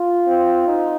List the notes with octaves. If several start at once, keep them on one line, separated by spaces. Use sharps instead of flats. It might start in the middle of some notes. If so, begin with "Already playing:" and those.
Already playing: F4
C4
D#4